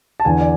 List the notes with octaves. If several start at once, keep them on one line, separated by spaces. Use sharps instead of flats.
A5
E2 D3 G#5
D5